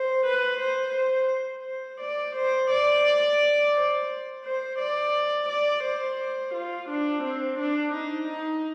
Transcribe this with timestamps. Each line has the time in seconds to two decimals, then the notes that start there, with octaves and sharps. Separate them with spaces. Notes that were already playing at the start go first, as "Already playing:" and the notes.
Already playing: C5
0.26 B4
0.60 C5
0.96 C5
1.65 C5
2.01 D5
2.36 C5
2.71 D5
3.75 C5
4.45 C5
4.79 D5
5.49 D5
5.85 C5
6.54 F4
6.89 D4
7.24 C4
7.60 D4
7.94 D#4
8.29 D#4